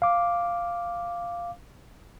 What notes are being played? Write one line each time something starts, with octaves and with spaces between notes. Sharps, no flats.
F5 D6